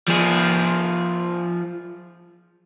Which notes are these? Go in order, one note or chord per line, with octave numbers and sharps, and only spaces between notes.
F3 G#4